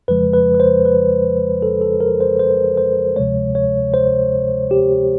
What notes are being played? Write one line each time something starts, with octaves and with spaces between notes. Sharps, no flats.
F2 C#3 F3 G#3 B4
B4
B4
C5
B4
A4
A4
A#4
C5
C5
C5
D2 C3 F3 G#3 C#5
C#5
C5
G4